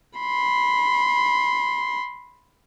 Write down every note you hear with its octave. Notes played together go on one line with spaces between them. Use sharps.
B5 C6